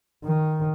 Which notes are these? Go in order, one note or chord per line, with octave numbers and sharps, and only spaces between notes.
D#3